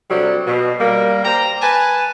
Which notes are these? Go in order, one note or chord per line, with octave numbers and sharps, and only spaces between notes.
C3 F#3 G3 C4 D4 A4
B2
G3 A#3
C5 D5 G5 A#5
B4 G#5 A5